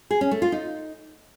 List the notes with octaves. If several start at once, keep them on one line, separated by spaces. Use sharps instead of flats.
G#4
C#4
A3
F4
D#4